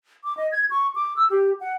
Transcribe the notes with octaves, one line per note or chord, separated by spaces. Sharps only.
D6
D#5
G#6
C#6
D6
E6
G4
F#5